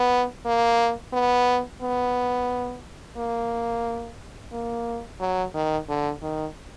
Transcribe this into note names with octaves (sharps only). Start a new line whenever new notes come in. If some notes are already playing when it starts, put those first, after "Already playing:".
Already playing: B3
A#3
B3
B3
A#3
A#3
F#3
D#3
D3
D#3